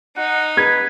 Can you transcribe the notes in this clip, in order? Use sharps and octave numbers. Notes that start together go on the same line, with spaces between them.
D#4 F#5
B4 G#6